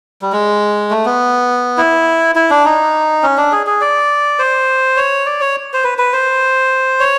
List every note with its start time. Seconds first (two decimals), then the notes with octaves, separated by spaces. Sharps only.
0.22 G3
0.32 G#3
0.91 A3
1.05 B3
1.78 E4
2.35 E4
2.50 D4
2.65 D#4
3.23 C#4
3.37 D4
3.52 G#4
3.67 G#4
3.81 D5
4.39 C5
4.97 C#5
5.26 D5
5.41 C#5
5.73 C5
5.84 B4
5.98 B4
6.13 C5
7.00 C#5